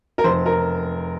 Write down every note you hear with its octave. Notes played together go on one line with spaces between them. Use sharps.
A#4
F1 C5
A#4